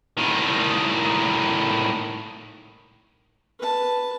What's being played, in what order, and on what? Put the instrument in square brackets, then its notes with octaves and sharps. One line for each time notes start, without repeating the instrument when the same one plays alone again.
[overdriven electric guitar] A2 D#3
[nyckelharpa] B4 A5